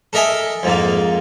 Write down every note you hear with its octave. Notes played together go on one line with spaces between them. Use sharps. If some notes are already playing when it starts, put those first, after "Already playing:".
A4 A#4 D#5 E5 G#5
F2 G#2 A#3